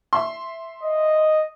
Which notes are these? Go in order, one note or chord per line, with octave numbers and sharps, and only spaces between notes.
E5 C6
D#5